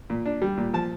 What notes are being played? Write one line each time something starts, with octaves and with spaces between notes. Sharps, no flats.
A#2
D4
G3
A#2
F3 A5